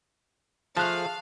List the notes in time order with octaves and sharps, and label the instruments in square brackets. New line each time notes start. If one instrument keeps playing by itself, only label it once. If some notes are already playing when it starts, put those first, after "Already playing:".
[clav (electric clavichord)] F3 [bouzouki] A3 G#4 [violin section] F5 [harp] A5 F#6